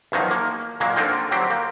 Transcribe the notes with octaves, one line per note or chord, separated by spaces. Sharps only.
E2 D#3 F3 F#3 D#4
A#3
A#2 F#3 G#3 A#3
D3 A#3 C4 D#4 F4 G5
F#3 C4 G4
A#3 F5 G5